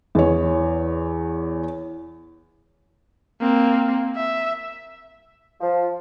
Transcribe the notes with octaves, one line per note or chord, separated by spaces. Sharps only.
E2 C#5
A#3 C4
E5
F3